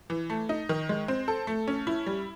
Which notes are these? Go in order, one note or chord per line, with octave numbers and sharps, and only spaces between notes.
E3
A3
D#4
D#3
G#3
C4
A4
A3
C#4
E4
G3